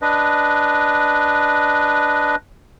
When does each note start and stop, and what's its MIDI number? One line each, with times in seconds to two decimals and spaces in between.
0.02 2.36 62
0.02 2.36 71
0.02 2.36 75